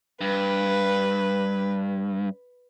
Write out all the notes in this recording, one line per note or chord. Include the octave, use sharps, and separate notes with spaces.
G2 B4